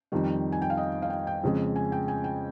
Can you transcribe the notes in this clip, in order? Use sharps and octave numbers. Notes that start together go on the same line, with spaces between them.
F2 D#3 G3
G#5
G5
F5
D#5
F5
G5
G5
F2 C#3 G#3
G#5
G5
G#5
G5